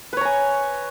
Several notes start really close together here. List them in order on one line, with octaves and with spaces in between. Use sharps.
B4 C#5 A#5 G#5